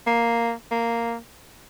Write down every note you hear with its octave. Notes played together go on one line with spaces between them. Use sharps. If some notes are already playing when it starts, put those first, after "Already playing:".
A#3
A#3